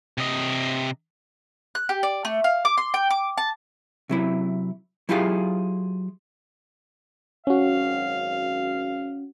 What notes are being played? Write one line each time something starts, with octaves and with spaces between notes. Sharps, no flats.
C3 D#5
F#6
G4
D5
A3
F5
D6
C6
G5
D6
A5
C3 F#3 E4
F#3 E4 F4 G4 G#4 F5
G#1 F#2 C#4 F#4 F5